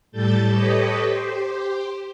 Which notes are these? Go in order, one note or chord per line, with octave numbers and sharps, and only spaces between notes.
A2 G3 A4 G6 A6
G4 A4 B4 C#5 D#5
G4 C5